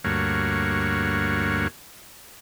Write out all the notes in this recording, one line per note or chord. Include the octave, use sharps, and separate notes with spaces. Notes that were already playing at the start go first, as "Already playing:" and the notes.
D2 G2 A#3 F#4 C#5